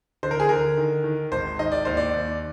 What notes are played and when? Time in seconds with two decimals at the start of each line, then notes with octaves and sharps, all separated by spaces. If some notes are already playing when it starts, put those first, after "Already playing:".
0.23 D3 C5
0.31 A#4
0.40 G#4
0.49 D3 A#4
0.77 D#3
1.04 D#3
1.32 G#1 C5
1.59 D#3 D#5
1.72 D5
1.85 D#2 C5
1.97 D5
2.14 D#2